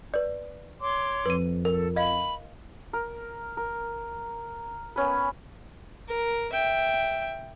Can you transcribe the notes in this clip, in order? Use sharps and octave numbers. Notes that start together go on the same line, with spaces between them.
B4 D5
C#5 C6 D6
F2 B4 D#7
A4 A#4
D#5 F5 B5
A#4
A#4
B3 C#4 B4
A#4
E5 G5